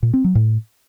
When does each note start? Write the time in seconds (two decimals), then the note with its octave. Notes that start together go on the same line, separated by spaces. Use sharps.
0.03 A#2
0.14 C4
0.24 F#3
0.35 A2